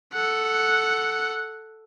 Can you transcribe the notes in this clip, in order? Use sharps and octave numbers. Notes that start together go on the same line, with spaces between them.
A4 F#5